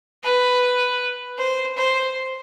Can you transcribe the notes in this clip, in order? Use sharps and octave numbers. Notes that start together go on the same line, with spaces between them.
B4
C5
C5